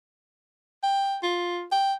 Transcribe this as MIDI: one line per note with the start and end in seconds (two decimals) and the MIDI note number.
0.83 1.17 79
1.23 1.65 65
1.72 1.93 79